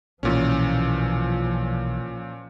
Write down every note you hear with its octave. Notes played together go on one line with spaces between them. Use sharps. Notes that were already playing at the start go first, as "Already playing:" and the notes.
B1 A#2 E3 F3 C#4